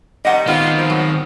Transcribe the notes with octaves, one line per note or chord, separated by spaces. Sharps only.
D#3 F3 G3 D#5 F#5
D#3 B3 C4 F4
F3
F#3